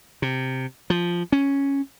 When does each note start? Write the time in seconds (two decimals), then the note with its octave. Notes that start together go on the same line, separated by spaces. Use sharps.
0.22 C3
0.90 F3
1.32 C#4